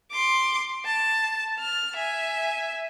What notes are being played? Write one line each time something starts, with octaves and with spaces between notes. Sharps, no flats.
C6 D6
A5
F6
E5 G#5